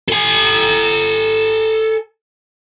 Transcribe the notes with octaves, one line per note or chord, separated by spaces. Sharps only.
A4 G#5